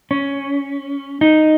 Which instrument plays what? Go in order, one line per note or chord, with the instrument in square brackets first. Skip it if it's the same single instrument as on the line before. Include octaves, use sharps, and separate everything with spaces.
[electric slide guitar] C#4
D#4